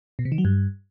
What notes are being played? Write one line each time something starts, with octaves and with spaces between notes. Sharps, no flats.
B2
C3
D#3
F#3
G2